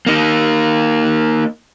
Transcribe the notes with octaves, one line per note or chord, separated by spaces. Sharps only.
A#3 D#4